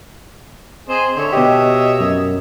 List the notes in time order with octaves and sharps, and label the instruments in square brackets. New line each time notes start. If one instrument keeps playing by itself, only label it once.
[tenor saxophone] C4 [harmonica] G#4 C5 D#5
[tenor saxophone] D3 [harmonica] C#5 E5
[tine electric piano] B2 G4 [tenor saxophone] D#5
[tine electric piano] F#2